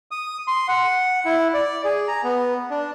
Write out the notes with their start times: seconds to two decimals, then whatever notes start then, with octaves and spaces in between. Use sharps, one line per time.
0.11 D#6
0.48 C6
0.68 F#5
1.25 E4
1.54 D5
1.84 G#4
2.08 A#5
2.23 B3
2.71 D4